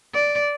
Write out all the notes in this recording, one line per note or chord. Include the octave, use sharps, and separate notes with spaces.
D5